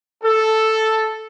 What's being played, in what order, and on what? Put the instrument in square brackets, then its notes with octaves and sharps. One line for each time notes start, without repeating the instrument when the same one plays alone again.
[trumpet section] A4